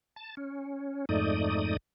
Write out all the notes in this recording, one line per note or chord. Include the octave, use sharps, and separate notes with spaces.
A5
C#4
F2 G#2 A3 D#4 D5 D#6